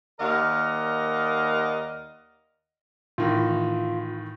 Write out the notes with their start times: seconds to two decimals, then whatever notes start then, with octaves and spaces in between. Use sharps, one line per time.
0.20 D#2 A#4 D5 D#5 F5 F#5
3.18 A2 D#3 E3 F4